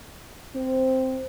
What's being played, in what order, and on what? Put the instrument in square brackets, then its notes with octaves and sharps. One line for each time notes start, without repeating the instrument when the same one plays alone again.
[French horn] C4 [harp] C5